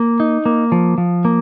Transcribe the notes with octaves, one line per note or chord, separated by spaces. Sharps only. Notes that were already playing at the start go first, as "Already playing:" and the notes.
Already playing: A#3
D#4
A#3
F3
F3
A#3